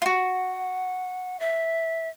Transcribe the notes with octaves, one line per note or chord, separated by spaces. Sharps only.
F4 F#4 F#5
E5